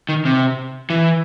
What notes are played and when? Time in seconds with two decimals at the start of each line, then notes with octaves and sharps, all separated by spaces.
0.09 D#3
0.25 C3
0.90 E3